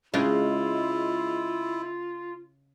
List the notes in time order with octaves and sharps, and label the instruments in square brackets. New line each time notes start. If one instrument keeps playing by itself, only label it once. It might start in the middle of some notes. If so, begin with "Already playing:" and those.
[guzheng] C#3 D4 G5 [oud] G#3 [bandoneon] E4 [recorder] F4